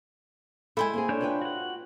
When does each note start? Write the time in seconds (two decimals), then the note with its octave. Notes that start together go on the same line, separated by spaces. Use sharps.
0.77 G#3 E4 A4 C5 G#5
0.94 A#3 C4 G#4
1.09 D4 C#5 G6
1.21 F4 B4 G5
1.41 F#4 F#5